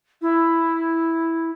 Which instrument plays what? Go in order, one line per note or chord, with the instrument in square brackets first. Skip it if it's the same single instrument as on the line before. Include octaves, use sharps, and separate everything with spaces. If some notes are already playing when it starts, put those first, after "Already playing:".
[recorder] E4